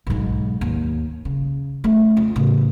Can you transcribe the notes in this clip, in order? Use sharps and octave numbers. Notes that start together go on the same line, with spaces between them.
B1 G#2
D#2
C#3
A3 C#4
F2
A1 C#3